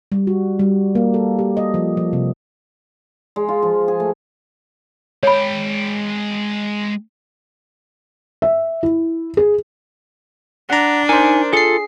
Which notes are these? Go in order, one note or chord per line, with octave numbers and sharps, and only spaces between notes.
G3
F#4
G3
A#3
A4
G4
D#5
F3
F3
C3
G#3
F4
F3
G#4
A3
G#3 C#5 G5 B5
E5
E4
G#4
D4 F#5 A#5
D#4 A#4 C5 G#5
F4 G#4 A4 C7